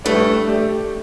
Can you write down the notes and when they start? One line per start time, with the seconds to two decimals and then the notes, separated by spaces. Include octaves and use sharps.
0.05 A2 G3 A3 D4 B4 D5
0.47 A3 G4 D5